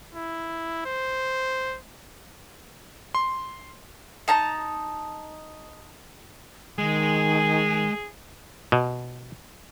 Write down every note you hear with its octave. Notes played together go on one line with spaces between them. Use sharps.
E4
C5
C6
D#4 A5 A#5
D#3 G#3 G#4
B2